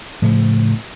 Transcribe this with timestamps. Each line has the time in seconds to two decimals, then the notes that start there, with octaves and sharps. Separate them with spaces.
0.22 A2 C#3 F3